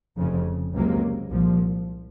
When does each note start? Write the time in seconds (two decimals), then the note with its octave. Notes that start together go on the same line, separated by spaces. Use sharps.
0.17 F1 F2 C#3
0.74 C#2 C3 F#3 A#3
1.30 C2 A#2 F3